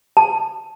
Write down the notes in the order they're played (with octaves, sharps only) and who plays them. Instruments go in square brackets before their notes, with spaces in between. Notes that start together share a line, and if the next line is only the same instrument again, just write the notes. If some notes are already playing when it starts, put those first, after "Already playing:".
[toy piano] A5